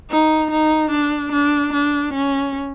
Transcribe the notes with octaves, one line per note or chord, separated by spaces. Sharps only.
D#4
D#4
D4
D4
D4
C#4